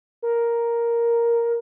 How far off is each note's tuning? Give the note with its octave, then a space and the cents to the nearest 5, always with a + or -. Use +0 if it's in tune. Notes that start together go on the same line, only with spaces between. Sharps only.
A#4 +5